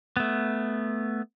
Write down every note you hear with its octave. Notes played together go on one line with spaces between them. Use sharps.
A3 B3